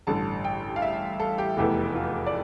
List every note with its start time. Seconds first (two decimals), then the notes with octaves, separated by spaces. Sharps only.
0.07 A1 G2 D3 A5
0.44 G5
0.76 F5
0.82 E5
1.20 A4
1.38 G4
1.57 F1 E2 E3 A3 G4
1.95 F4
2.27 D5